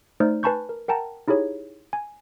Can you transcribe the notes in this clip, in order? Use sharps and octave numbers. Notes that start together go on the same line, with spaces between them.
A3 D#4 C5 D5 F6
B4 G#5 A5 B5 C#6 G6
A#4
A#4 F#5 G5 A5 A#5
D#4 E4 G4 G#4 C#5
G#5